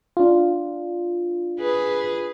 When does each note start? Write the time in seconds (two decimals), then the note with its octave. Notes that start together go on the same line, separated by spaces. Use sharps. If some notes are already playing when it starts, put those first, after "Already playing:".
0.17 D4 F4
1.59 G#4 B4